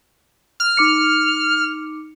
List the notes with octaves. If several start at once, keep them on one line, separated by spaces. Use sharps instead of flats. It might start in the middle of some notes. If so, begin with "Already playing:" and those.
F6
D#4 D6 C#7